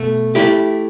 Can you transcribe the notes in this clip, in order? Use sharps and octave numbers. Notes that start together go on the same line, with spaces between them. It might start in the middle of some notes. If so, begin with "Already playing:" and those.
Already playing: B2 A3
A3 E4 G4